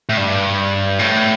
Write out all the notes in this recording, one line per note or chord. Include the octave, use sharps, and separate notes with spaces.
A2
G2
A2